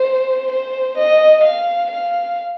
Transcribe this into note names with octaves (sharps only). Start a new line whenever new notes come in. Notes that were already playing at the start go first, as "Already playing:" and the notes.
Already playing: C5
C5
D#5
F5
F5